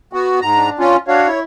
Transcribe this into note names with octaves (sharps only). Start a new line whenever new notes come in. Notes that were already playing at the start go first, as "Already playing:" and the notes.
B3 F#4
G#2 A#5
D4
C#4 F4
D4 F#4 C#5 F5
E4